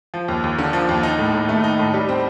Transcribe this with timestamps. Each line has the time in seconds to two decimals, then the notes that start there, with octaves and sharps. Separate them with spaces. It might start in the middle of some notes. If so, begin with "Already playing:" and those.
0.14 F3
0.28 D#2
0.44 D#2
0.58 D3
0.73 F3
0.89 D#2
1.03 D#4
1.19 A2
1.34 A2
1.49 A3
1.64 D#4
1.79 A2
1.94 G3
2.09 C4